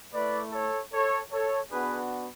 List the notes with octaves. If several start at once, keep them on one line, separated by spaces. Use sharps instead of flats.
A3 E4 B4 D5
A4 C#5
A4 C#5
A4 C#5
B3 D4 F#4 G#4 B4